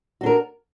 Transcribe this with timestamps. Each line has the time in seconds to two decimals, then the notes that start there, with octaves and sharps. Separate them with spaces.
0.21 F#4
0.23 D4
0.26 A#4